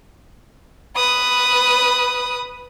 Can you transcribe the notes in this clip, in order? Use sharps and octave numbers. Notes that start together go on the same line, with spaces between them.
B4 D#6